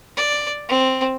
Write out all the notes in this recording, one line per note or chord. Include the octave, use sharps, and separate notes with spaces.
D5
C4